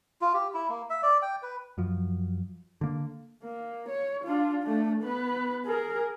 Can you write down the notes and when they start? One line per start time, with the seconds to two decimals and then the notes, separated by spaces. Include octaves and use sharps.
0.21 F4
0.34 G4
0.54 E4
0.70 A#3
0.90 E5
1.03 D5
1.22 G5
1.43 B4
1.78 F#2 F3
2.81 D3 A#3
3.44 A#3
3.89 C#5
4.25 D4 F4
4.63 A3 D4
5.03 B3 B4
5.66 G#4 A#4